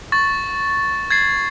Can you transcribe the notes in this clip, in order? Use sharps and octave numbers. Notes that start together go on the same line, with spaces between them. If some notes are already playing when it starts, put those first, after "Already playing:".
C#6 A6
G#6 A6 C7